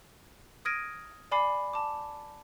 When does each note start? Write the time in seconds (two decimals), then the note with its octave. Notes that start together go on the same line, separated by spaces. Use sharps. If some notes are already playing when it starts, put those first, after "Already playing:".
0.65 D#6 F6 G#6 A#6 D7 D#7
1.31 D5 G#5 B5 D6 C7
1.73 A5 D6